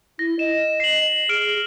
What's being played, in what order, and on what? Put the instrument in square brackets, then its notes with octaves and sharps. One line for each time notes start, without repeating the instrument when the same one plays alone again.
[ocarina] E4 [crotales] A#6
[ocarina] D#5 [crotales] E7
[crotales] C7 F#7
[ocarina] G#4 [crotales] F6 D7 F#7